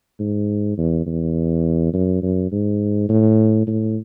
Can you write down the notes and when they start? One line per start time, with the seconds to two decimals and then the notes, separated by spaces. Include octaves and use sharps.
0.19 G#2
0.78 E2
1.06 E2
1.94 F#2
2.22 F#2
2.52 G#2
3.09 A2
3.67 A2